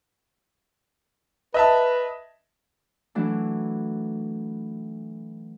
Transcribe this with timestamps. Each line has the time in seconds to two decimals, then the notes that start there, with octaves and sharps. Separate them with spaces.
1.54 B4 D#5 E5 A5
3.15 E3 F#3 A3 D4